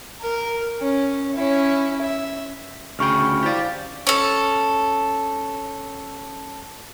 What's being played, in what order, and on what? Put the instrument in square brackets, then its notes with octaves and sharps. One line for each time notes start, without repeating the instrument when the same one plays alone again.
[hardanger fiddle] A#4
C#4
C#4 E4
E5
[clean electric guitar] D2 C#3 G5 [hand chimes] B5 C#6 F6
[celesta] E4 C5 F5 [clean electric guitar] G4 D5
[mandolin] C#4 A4